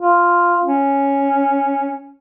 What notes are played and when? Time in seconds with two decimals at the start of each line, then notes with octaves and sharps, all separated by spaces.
0.01 F4
0.65 C#4